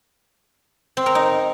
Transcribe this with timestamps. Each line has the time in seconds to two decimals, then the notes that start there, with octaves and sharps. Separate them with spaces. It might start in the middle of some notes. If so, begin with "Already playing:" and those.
0.97 C4
1.06 A#4
1.15 D#4